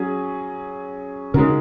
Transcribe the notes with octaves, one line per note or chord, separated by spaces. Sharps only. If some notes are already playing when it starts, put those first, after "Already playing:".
Already playing: F#3 C#4 G#4
C#3 G#3 D#4 F#4 A#4